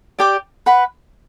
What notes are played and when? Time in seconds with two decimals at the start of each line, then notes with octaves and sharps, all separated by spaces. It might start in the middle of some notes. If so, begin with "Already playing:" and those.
0.19 G4 D5 G5 D6
0.66 B4 F#5 B5